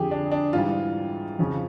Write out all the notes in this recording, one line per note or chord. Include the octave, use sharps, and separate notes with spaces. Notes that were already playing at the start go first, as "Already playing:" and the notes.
Already playing: F2 D3 F3 G4 G#4
D4
D4
G#2 E3 G3 F4
F2 C#3 F3